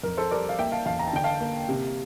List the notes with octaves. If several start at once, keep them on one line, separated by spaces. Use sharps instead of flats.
F2 A#4
A4 C5
G3 A#4 D5
F5
A#3 E5 G5
F5 A5
E2 F5 A5
A#5
A5
D3 G5
F5 A5
A#3
C3